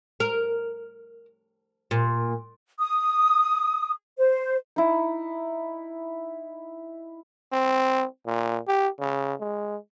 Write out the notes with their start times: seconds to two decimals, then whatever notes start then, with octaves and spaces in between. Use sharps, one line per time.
0.20 A#4
1.91 A#2
2.79 D#6
4.18 C5
4.76 D#4 E4
7.53 C4
8.26 A#2
8.68 G4
9.00 C#3
9.40 G#3